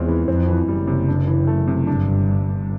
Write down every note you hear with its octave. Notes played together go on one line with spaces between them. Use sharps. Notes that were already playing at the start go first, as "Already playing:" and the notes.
Already playing: E2 G#3 C4 F4
E3
F2 C4
E3
F#1 F#2 G3
C3
D4
E3
A3
C3
G1 G2 D4